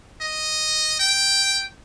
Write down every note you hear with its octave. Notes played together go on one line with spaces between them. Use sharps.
D#5
G5